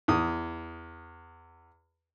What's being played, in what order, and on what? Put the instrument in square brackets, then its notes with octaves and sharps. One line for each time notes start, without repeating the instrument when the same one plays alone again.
[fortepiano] E2 D#6